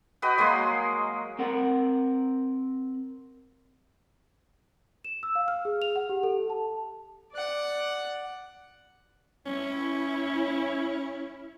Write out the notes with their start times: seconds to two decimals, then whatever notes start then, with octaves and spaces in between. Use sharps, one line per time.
0.22 F#4 B4 D#5 G5
0.38 F#3 G#3 A#3 C6
1.39 C4 A#4 F#5
5.05 E7
5.23 E6
5.35 F5
5.48 F6
5.65 G#4
5.82 F7
5.96 F#5
6.09 G4
6.23 A4
6.50 A5
7.33 D5 F#5
9.46 C#4 E4